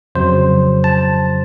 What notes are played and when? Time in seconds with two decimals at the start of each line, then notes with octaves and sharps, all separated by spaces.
0.15 F2 C#3 F#3 C5
0.84 A5